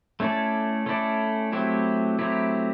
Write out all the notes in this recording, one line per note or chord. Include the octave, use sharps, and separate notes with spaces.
A3 C#4 E4 A4 D5
A3 C#4 E4 A4 D5
F#3 A3 C4 E4 G4
F#3 A3 C4 E4 G4